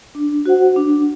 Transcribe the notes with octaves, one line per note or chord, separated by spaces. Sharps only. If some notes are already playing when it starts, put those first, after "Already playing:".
D4
F#4 C5 F#5
D4